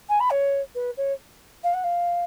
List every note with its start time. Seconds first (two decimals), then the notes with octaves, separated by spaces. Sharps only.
0.09 G#5
0.20 B5
0.31 C#5
0.75 B4
0.97 C#5
1.64 F5
1.74 F#5
1.84 F5